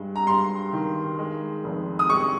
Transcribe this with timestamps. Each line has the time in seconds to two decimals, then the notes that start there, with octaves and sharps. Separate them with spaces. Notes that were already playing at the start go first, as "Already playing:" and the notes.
Already playing: G2 G#3
0.16 A#5
0.27 G2 C6
0.73 D#3
1.18 G#3
1.64 F1
1.99 D#6
2.09 G#3 C#6